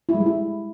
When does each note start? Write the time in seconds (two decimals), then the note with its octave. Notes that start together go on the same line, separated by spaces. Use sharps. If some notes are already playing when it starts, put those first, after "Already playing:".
0.09 E4
0.14 G#3
0.20 G3
0.26 E4